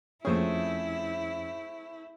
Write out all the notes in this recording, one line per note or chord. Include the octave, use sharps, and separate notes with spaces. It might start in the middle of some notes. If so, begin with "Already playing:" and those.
F2 A3 C4 C#4 E4 G#4